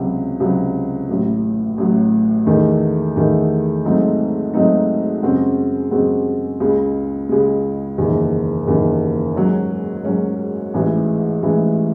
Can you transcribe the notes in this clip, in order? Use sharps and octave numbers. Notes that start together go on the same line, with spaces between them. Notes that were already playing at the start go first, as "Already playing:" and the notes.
Already playing: C#2 C3 F#3
C#2 C3 F#3
A1 A2 F#3
A1 A2 F#3
E2 D#3 A3
E2 D#3 A3
G#2 F#3 A3 C4 D#4
G#2 F#3 A3 C4 D#4
F#2 C#3 G#3 C4 F#4
F#2 C#3 G#3 C4 F#4
C#2 C#3 G#3
C#2 C#3 G#3
F#1 E2 D#3
F#1 E2 D#3
G#2 F#3 C#4
G#2 F#3 C#4
A1 G#2 E3 G#3
A1 G#2 E3 G#3